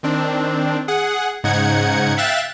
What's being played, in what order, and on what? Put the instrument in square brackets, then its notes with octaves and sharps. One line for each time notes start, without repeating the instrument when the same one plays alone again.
[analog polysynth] D#3 C4 D4
G#4 F#5
G#2 C#3 D#4 F#5 G#6 C#7
E5 F5 G5 F#6 A6 E7